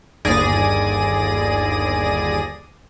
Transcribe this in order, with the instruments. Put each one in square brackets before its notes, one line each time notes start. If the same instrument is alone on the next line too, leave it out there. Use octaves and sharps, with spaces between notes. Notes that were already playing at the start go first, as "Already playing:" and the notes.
[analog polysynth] G1 D#2 G#4 D5 A#6 D#7